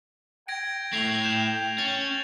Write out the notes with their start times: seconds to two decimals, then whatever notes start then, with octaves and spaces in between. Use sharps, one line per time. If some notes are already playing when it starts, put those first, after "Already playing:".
0.48 G5 G#6 A#6 D7
0.93 A3 E4 A#6 C7 F7
1.24 G6 E7
1.78 C#4 A6 F7